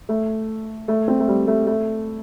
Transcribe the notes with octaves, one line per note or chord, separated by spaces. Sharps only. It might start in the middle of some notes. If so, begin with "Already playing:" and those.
A3
A3
C4
A3
G3
A3
A3